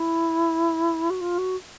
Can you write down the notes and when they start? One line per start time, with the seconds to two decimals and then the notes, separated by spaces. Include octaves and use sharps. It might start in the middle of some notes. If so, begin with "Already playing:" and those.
Already playing: E4
1.10 F#4
1.21 F4
1.38 F#4